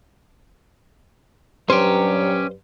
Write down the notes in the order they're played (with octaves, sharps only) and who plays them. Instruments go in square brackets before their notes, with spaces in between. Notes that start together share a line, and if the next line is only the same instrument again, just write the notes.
[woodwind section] G2 F#3 [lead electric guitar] C#4 G4 [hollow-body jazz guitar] C5